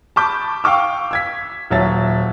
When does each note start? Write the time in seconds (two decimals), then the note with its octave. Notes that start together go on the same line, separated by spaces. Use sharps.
0.16 A5 B5 D6 G6
0.64 F5 G5 C#6 D6 E6
1.11 E6 G#6 B6
1.70 D#1 F#3 E5 A6